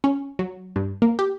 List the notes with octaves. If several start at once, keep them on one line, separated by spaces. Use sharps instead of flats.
C#4
F#3
G2
A#3
G4